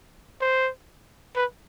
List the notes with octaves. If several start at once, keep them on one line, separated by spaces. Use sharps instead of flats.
C5
B4